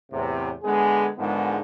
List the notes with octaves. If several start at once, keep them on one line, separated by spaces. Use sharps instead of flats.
E2 A2 C3
D3 G#3 B3 G#4
G#2 D3 D#3 F3 G#3 B3